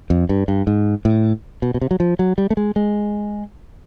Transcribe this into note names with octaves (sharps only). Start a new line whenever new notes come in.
F2
G2
G2
G#2
A2
B2
B2
C3
F#3
F3
F#3
G3
A3
G#3
G#3